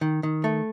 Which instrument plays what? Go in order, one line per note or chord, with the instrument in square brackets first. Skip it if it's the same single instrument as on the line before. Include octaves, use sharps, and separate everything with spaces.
[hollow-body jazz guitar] D#3
D#3
A3